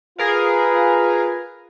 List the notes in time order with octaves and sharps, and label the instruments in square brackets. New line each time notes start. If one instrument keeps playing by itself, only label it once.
[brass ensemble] F4 B4 [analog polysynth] G#4 A#4 F5